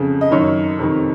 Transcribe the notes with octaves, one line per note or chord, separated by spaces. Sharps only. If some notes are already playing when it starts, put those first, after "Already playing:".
Already playing: F2 C#3
D#5
F#2 D#3 C#5
F2 C3 D#3